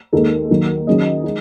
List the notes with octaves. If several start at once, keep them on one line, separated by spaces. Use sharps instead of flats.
D#2 D#3 G#3 D#4 A4
D#2 D#3 F#3
D#3 F#3 C#4 G#4 D#5
G#3 D#4